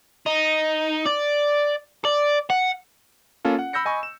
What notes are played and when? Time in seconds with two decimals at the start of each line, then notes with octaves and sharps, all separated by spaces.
0.27 D#4
1.07 D5
2.05 D5
2.50 F#5
3.45 A#3 C#4 F4 A4
3.59 F#5
3.73 B5 E6 G6 A#6 C#7
3.85 D#5 G#5 B5 C#6
4.03 E7